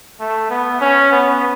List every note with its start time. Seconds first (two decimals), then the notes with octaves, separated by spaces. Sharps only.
0.20 A3
0.50 B3
0.81 C#4
1.11 B3